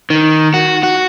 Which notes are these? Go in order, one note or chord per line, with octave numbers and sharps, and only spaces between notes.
D#3
F#4
F#4